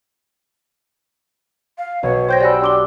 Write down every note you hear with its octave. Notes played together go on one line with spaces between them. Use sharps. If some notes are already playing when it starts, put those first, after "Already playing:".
F5
B1 B2 C#5
C5 C#5 G5 G6 A#6
G4 D5 F#5 G#5 B5 E6
D4 C6 D6 G7